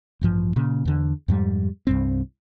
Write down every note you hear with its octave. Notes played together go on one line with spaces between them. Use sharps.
A1 G2 F3
A#2 C#3
E2 D3
F2 G#2 G3
C2 G2 C4